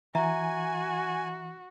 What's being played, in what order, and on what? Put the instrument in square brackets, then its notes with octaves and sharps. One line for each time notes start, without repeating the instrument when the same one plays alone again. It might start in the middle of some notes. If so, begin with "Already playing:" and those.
[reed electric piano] E3 [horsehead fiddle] F#4 [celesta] E5 A#5 [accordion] G#5